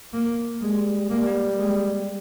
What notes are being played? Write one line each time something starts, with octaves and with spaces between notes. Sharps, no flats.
A#3
G3 G#3
G3 A#3
G#3